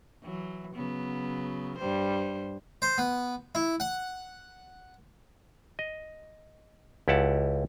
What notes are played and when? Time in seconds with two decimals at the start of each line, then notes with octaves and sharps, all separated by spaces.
0.24 E3 F#3
0.75 C#3 F#3 B3
1.78 G2 G3 C5
2.82 C5
2.98 B3
3.55 E4
3.80 F#5
5.79 D#5
7.08 C#2 E4 G4 F#5 A5